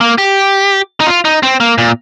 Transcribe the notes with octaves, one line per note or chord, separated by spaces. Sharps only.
A#3
G4
D#4
F4
D#4
C4
A#3
A#2